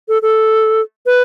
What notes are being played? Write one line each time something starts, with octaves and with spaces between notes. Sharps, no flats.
A4
A4
B4